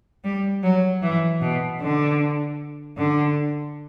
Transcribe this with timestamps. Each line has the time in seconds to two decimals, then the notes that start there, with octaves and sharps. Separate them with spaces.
0.24 G3
0.63 F#3
1.02 E3
1.41 B2
1.80 D3
2.97 D3